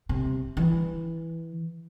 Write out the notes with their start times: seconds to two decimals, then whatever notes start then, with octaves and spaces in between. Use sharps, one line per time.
0.09 C3
0.57 E3